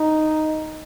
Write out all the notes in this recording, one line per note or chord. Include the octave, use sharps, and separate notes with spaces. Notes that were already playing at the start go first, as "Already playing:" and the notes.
Already playing: D#4